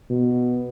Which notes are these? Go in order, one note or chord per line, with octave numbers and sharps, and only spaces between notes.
B2